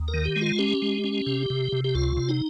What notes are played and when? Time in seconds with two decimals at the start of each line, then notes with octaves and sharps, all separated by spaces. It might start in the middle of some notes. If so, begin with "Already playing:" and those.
Already playing: D#2
0.08 A#4
0.14 D#3
0.25 G4
0.36 G#3
0.41 F4
0.59 C#4 G4
0.82 G#3
1.04 C#4
1.27 C3
1.50 C3
1.72 C3
1.84 G4
1.95 C#2 F4
2.17 C3
2.29 D#4